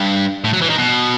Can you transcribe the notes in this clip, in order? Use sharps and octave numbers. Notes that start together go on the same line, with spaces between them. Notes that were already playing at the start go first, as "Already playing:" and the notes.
Already playing: G2
A2
F#3
E3
D#3
B2